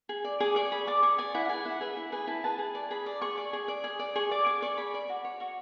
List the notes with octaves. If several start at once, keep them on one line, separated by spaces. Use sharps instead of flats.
G#4
D5
G#4 D6
D5 C#6
G#4 B5
D5 D6
G#4 C#6
D5 G#5
E4 F#5
F#5
G#4 B4 G#5
E4 F#5
G#4 B4 E5
E4
G#4 B4 G#5
E4 A5
G#4 B4 A5
G#4
D5 A5
G#4 B5
D5
G#4 C#6
D5
G#4
D5
G#4
D5
G#4 C#6
D5 D6
G#4 D6
D5 C#6
G#4 B5
D5
F#4
C#5
F#4 C#6